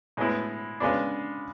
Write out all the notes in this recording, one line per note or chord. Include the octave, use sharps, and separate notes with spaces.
A2 G#3 B3 E4
C#3 G#3 B3 D4